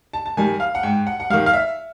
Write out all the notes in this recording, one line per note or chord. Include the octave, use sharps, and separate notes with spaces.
A5
A5
D#3 G3 G#5
F5
F#5
G#2 G5
F#5
F#5
D#3 G3 F5
F5
E5